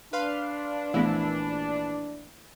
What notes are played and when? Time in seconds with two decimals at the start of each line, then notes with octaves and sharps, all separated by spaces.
0.13 D4 B4 F5 C6
0.94 A#1 E3 A3 B3 E4